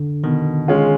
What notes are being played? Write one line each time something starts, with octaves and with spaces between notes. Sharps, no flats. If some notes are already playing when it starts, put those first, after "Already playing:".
Already playing: D3
B2 D#3
G#3 C#4 F4